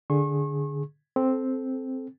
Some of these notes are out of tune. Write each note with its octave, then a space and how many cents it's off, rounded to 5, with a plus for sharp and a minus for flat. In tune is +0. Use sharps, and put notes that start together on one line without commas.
D3 +0 G#4 +0 C#6 -35
C4 +0 A4 -15